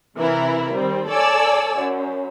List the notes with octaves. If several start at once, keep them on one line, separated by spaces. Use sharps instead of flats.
C3 E3 E4 A#4
D#3 G3 C4
A4 C#5 D5 G#5 E6
F#2